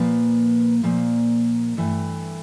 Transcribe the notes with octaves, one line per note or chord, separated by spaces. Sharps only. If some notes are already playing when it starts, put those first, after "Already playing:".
Already playing: A#2 F3 A#3 B4
A#2 F3 A#3
G2 E3 A3